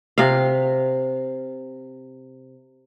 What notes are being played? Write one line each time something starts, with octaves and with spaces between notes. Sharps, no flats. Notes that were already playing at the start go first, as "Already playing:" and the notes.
C3 F5